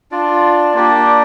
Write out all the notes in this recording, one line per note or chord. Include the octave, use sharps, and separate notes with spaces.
D4 F4 D5
A#3 D4 G4 D5